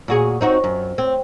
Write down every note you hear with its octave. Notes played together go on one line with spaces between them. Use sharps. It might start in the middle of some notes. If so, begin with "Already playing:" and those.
A#2 F#4 G#4
C4 D#4 F#4
F#2
C4